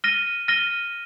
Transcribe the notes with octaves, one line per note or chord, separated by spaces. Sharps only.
F6 A#6 D#7 G7
F6 A#6 D#7 G7